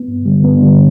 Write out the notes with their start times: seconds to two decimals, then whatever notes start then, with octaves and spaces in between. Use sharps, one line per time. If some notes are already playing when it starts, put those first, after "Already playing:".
Already playing: B3
0.08 G2
0.26 D3 G3
0.44 G2 B3
0.62 D3 G3